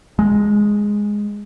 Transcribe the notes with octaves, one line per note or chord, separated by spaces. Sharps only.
G#3